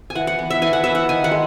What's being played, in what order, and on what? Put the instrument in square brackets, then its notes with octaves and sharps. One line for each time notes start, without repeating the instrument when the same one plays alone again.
[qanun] G#5
E3 F#5
F#5
B3
E5
E3 G#5
F#5
B3 E5
F#5
D#3 G#5
F#5
G#3